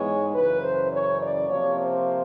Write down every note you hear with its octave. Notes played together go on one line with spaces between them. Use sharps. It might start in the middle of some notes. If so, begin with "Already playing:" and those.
Already playing: G#2 E3 G#3 B3 C#5
F#2 C#3 E3 B4
C5
C#5
D5
C3 F3 A#3 C#5
C5